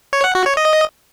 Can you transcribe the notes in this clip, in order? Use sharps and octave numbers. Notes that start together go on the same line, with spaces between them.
C#5
F#5
F#4
C#5
D#5